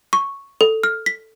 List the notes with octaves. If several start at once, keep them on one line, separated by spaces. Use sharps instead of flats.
C#6
A4
F6
B6